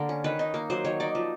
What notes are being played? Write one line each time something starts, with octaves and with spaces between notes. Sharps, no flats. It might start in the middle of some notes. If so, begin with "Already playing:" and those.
Already playing: D3 A#3 A#4
C#4
D#3 B4
D#4
A#3
F#3 C5
D#3 C#5
D#4 D5
F3